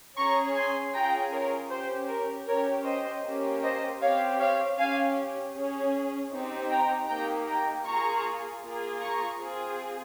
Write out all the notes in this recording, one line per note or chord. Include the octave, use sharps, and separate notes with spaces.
C#4 G#4 A#5 C#6
G#5 C6
C#4 F4 G#4 G5 A#5
A#4 C#5
C#4 G4 C5
A#4
C#4 G4 A#4 C#5
C5 D#5
A#3 C#4 G4
C5 D#5
C4 G4 C#5 F5
C#5 F5
C#4 G4 F5 G#5
C#4 G#4
C4 D#4 G4
G5 A#5
A#3 D#4 G4 G5 A#5
G5 A#5
A#3 F4 G#4 A#5 C#6
A#3 F4 G#4
A#5 C#6
C4 F4 G#4